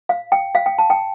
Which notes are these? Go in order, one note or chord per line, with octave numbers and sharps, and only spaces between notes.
F5
G5
F5
G5
A5
G5